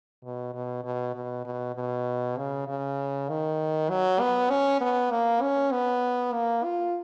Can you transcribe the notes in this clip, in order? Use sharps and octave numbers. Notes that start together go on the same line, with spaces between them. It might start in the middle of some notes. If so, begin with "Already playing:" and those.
B2
B2
B2
B2
B2
B2
C#3
C#3
D#3
F#3
B3
C#4
B3
A#3
C#4
B3
A#3
F4